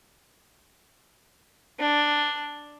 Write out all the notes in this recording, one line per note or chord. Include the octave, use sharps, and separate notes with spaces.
D4